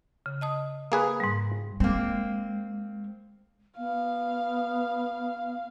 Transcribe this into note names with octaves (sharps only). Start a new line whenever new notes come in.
C#3
D#5 A5 D#6
A#3 G#4 B4
G#2 G3
G#3 A#3 C4
B3 F5